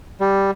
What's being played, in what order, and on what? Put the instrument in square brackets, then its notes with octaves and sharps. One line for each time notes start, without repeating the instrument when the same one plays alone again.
[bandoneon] G3